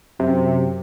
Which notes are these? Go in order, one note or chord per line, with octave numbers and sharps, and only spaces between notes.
F#2 C3